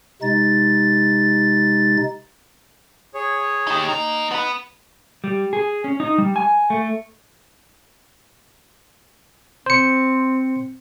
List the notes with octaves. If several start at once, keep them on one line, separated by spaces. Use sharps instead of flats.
C3 G#3 D#4 A6
G#4 C#5
D#4 G4
A#3 D#4
B3 B4
G3
G#4
C#4
D#4
G3
G#5
A3
C4 C5 C#7